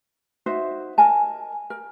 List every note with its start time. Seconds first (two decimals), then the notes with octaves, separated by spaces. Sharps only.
0.46 D#4 F#4 C5 E5
0.98 A#4 D#5 G#5 A5
1.70 A#4